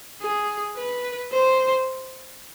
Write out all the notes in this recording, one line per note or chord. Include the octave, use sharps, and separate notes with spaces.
G#4
B4
C5